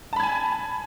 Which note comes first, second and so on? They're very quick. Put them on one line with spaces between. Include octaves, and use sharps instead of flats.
A5 B5 G#6 G#5